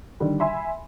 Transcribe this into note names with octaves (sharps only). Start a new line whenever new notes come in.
D3 D#3 G3
E5 G#5 B5 C6